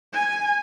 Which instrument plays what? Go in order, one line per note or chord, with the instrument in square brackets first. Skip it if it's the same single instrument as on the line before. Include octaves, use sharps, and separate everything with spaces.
[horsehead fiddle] G#5